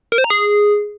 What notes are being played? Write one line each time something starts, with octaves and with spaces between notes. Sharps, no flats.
A#4
C5
A#5
G#4